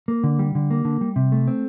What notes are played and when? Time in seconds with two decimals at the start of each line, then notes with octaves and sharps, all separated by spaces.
0.08 A#3
0.24 D3
0.39 G3
0.55 D3
0.71 A#3
0.85 D3
1.01 G3
1.16 C3
1.32 A3
1.47 C4